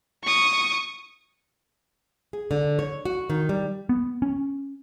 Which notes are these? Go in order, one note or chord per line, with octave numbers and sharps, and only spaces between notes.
C#6 D#6
G#4
D3
C#5
F#4
D#3
G3
B3
C#4